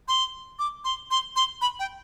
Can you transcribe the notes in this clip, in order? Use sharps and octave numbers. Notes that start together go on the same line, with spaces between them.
C6
D6
C6
C6
C6
B5
G5